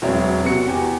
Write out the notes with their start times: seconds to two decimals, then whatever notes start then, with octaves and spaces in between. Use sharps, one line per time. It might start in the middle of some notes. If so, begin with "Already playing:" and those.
0.02 E1 F#3 C4 E5
0.43 C3 B3 F#4 C#7
0.67 E2 G4